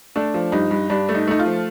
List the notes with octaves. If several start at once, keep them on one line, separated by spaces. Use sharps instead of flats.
A3 D4
F3
G2 D#4
G2
G2 D4
A3
D#4
A3 D#4
F4
F3